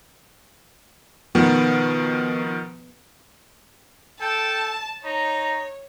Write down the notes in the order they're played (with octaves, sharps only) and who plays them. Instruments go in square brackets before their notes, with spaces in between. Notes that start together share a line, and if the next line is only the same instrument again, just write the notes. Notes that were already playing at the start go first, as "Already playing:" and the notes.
[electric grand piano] B2 D#3 F3 [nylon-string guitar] B3
[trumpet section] A4 G5 [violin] A5
[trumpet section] D#4 A#5 [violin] C#5